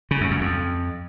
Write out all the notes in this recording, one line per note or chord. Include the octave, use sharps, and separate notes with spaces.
C#3
F#2
F#2
F2